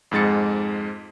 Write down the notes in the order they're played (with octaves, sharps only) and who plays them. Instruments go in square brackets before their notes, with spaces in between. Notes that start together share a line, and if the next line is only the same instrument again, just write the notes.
[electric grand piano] F2 G#2 G#3 A6 C#7